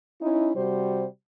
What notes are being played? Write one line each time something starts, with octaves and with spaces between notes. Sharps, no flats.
C#4 D#4 E4
C3 G3 F#4 C5